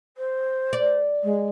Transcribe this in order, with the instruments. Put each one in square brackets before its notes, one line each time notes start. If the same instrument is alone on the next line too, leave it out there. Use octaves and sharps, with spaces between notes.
[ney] C5
[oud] D5
[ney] G#3